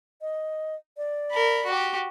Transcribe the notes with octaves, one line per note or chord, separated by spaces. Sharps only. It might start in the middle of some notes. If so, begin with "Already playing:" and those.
D#5
D5
A#4 B5
F#4 G4